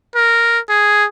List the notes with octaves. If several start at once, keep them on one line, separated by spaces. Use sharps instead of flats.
A#4
G#4